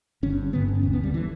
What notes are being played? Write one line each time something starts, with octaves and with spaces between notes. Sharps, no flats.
G1 G2 D3 C#4
G1 G2 D3 B3
C#4
E1 D2 D3 C#4
B3
G3
D3 E3